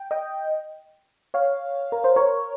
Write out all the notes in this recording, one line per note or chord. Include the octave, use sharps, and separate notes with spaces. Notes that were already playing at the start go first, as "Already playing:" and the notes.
Already playing: G5
D#5 G5
C#5 F5
A#4
C5
A#4 C#5